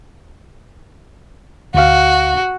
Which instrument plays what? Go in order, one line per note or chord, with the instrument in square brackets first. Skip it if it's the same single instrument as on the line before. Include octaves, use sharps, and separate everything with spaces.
[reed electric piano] D2 F5 [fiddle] F#4